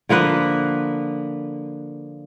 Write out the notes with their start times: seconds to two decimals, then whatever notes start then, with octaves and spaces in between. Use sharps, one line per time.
0.09 D3 F3 A#3 B4